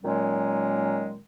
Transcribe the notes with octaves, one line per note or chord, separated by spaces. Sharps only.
A#2 D#3 F#3 G#3 C#4